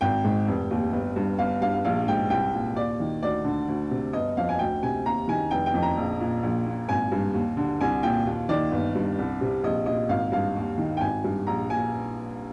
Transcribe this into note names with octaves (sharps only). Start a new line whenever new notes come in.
G#1 G5
G#2
F1
D#2
G1
G2
G1 F5
G2 F5
F5
A#1 F5
G#2 G5
C2 G5
A#2
D#2 D5
D#3
D2 D5
D3
D2
C3
G1 D#5
F2 F5
G#5
D2 G5
C3 G#5
D#2 A#5
D#3 G#5
F1 G5
G5
F2
A#5
A#1
A#2
A#1
A#2
G#1 G#5
G2
D#2
D3
C2 G#5
A#2 G5
D#2
D#3 D5
G1
G2
C2
C3
A#1 D#5
A#2 D#5
G#1 F5
G2 F5
D#2
D#3
G5
G#1 G#5
G2
A#1 A#5
A#2 G#5